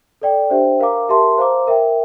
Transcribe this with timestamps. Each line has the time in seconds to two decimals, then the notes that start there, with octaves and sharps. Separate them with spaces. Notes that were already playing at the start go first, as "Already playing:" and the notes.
0.22 A4 D5 G5
0.50 D4 G4 C5 E5 G5
0.79 A#4 F5 A#5 D6
1.09 G4 A#4 E5 A5 C6
1.38 C5 F5 A#5 D6
1.67 A#4 E5 G5